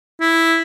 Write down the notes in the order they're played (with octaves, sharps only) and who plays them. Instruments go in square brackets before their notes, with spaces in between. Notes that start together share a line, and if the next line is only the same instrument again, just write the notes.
[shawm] E4